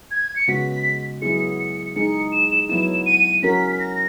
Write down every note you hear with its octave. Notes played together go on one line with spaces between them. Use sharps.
G#6
C#7
C#3 G#3 B3 F#4 B6
F#3 B3 E4 G#4 C#7
C#7
G#3 D#4 G#4 C#7
E7
F#3 B3 E4 E7
D#7
F#3 C#4 F#4 A#4 B6
B6
A#6